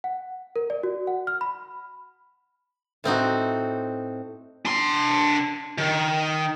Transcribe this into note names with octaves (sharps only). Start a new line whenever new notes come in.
F#5
A#4
D5
F#4
F#5
F6
B5
A2 C4 D#4 F#4
D4 C6
D#3